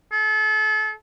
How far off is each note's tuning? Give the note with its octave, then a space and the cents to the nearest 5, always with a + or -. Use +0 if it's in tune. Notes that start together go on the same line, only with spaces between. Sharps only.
A4 -35